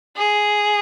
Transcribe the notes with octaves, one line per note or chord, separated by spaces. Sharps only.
G#4